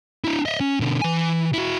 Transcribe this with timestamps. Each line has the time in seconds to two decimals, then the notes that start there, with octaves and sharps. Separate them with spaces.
0.24 D4 E4
0.46 D#5 E5
0.60 C#4
0.80 B2 D3
1.02 E3 G#5
1.54 E4 F#4